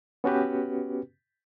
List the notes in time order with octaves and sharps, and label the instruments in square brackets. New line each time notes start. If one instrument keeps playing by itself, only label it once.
[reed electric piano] B3 C#4 F#4 G4 B4